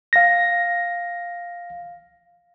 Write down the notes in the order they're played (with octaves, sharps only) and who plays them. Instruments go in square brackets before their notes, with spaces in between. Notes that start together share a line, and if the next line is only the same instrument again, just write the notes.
[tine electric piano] F5 A#6